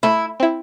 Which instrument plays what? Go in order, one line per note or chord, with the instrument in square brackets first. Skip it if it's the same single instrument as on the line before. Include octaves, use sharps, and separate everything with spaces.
[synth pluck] A3 [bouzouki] E4
[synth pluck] C4 E4